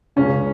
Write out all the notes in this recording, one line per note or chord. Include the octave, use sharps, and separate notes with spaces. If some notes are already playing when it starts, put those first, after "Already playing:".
C#2 C#3 C#4